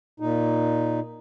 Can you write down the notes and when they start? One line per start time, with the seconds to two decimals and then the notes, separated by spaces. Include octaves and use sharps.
0.20 A#2 D#4